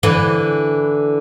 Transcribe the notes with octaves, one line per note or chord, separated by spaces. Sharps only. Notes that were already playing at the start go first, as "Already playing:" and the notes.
D3 E3